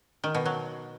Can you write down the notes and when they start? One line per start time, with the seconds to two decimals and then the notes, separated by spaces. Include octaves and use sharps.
0.24 D#3
0.35 B2
0.46 F#3